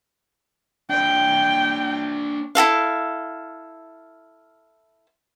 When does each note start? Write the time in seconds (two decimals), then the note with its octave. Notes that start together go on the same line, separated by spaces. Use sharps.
0.90 D4 C5 G5
2.55 E4 F#4 A4 F5